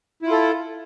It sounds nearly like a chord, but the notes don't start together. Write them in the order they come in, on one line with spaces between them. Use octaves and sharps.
E4 F4 A4